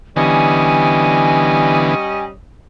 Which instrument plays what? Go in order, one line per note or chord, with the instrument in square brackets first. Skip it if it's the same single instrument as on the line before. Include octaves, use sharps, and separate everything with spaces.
[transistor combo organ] D3 E3 B3 [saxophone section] G3 C#4 D#5 [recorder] G#5